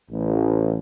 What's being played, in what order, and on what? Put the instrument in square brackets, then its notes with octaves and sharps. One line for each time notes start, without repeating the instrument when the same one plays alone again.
[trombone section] A1